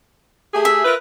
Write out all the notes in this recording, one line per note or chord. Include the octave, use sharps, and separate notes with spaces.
A3 G4 G#4
E5
F4 A#4 B4